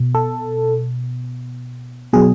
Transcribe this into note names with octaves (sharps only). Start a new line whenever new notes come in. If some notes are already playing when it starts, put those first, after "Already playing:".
Already playing: B2
A4
B2 F#3 G#4